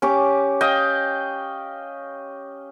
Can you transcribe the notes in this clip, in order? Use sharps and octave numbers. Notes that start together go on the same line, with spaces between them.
C#4 G4 D6
D#5 F5 G5